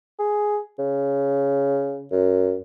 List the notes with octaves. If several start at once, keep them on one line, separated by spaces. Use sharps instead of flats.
G#4
C#3
F#2